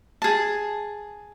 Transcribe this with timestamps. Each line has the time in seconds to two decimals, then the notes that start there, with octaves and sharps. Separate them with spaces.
0.22 G#4 A5